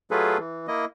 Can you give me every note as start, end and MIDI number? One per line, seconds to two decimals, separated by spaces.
0.11 0.38 54
0.11 0.38 57
0.11 0.38 65
0.11 0.38 68
0.11 0.38 69
0.11 0.38 71
0.39 0.67 52
0.68 0.85 58
0.68 0.85 64
0.68 0.85 75